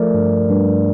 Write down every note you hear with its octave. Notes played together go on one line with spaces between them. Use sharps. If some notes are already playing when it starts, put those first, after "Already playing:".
Already playing: F3 A3 A#4 D5
G2
G2